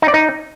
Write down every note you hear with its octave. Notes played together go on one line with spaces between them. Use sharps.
D#4
D5
D#4